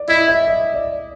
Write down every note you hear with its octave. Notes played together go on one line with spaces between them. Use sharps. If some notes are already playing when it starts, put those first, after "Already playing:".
Already playing: D5
E4 D#5
E5
D#5
D5